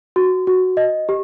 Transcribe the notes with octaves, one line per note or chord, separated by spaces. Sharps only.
F#4
F#4
D#5
G4